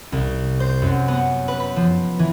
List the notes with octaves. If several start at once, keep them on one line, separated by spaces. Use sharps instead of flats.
C2
C5
F#2
B3
B4
B5
F3
E3